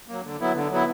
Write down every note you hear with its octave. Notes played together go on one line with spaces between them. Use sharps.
F#3 A#3
D3
F#3 B3 E4
D3
F#3 B3 E4